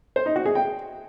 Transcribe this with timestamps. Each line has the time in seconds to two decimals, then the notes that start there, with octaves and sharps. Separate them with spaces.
0.16 C5
0.26 D#4
0.36 F#4
0.46 G#4
0.55 G5